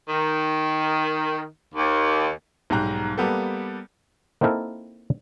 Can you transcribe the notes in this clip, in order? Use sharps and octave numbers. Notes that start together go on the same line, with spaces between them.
D#3
D#2
B1 G#2 G3 G5 A#5 F#6
G3 A#3 B3 G4 A4
A#3 C4 D#4 E4 A4 A#4